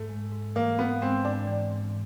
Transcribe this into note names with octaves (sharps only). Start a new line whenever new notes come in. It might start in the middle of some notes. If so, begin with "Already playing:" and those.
Already playing: G#2 A3
G#3
G#2
E3 A#3
G#2 B3
G#3 C4
G#2 D4
E3
G#2